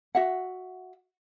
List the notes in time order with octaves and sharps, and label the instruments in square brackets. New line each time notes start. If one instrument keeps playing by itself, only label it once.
[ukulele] F#4 E5 F#5